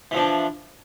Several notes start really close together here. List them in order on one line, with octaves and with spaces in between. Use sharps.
E3 F3 D4